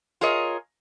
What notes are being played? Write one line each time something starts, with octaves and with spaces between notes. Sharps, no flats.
F4 G#4 A#4 C#5 D#5